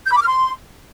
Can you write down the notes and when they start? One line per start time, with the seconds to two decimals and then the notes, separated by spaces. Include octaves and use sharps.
0.06 G6
0.11 B5
0.16 D6
0.22 F6
0.27 C6